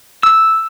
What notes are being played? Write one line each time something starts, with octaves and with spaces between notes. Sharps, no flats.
E6